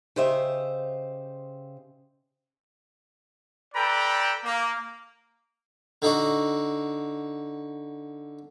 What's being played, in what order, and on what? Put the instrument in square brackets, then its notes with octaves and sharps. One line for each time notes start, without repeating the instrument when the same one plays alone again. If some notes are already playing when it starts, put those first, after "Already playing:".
[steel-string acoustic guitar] C#3 G4 C5 D#5 E5
[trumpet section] A4 B4 D5 G5 A#5 B5
A#3
[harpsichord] D3 D#4 F#4